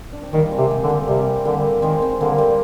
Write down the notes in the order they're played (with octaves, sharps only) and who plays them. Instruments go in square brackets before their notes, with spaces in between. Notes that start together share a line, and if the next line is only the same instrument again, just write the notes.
[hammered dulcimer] D4
C4
[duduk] D#3 [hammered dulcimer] G3 A#3
[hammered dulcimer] G#3 C4
[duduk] C3
[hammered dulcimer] G#3 C4
[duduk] D3
[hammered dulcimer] G3 A#3
[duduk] C3 [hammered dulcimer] G3
[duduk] D3 [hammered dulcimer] G3 A#3
[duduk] D#3 [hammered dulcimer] G#3 C4
[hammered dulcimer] G#3 C4
[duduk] D3 [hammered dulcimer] G3 A#3
[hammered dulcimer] G3